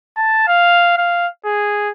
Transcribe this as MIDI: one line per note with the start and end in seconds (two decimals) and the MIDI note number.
0.17 0.46 81
0.48 0.93 77
0.98 1.28 77
1.45 1.91 68